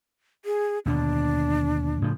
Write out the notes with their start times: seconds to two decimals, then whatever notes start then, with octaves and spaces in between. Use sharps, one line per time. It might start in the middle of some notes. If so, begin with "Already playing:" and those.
0.45 G#4
0.86 D#2 B2 D3 D4
2.02 A2 C#3 F3